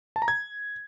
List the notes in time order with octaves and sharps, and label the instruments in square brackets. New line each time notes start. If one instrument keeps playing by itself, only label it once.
[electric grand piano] A5
A#5
G#6